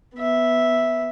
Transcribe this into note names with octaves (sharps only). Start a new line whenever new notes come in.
B3 E5